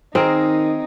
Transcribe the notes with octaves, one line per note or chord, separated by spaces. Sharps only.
D#3 C4 D#4 G#4 A#4 A#5